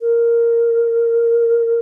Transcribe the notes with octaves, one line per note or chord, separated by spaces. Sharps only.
A#4